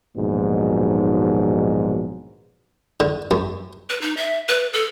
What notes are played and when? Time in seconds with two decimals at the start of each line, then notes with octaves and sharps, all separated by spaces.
0.16 A#1 D#2 G#2 B2 F#3
3.00 D3
3.31 F#2
3.90 B4
4.01 D#4
4.17 E5
4.49 B4
4.73 A4